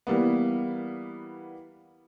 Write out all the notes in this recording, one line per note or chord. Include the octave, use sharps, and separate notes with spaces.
E3 G3 A#3 B3